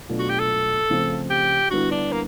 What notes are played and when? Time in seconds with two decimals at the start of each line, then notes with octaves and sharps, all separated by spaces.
0.09 B2 F#3 A3 D4 F4
0.19 F#4
0.30 G4
0.39 A4
0.90 C#3 F3 A3 C4
1.30 G4
1.71 D3 G3 B3 E4 F#4
1.92 D4
2.12 A#3